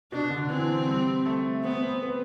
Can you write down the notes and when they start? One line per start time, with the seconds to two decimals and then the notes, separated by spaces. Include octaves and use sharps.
0.12 B2 D4
0.31 D3
0.49 E3 C4
0.88 G3
1.26 A3
1.64 B3 C4
1.83 C4
2.02 B3